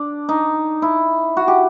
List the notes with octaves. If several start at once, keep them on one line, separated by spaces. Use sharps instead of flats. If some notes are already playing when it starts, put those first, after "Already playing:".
Already playing: D4
D#4
E4
F#4
G4